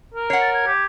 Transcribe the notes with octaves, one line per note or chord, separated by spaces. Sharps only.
A#4
C#5 F#5 C7
A6
G#6
G4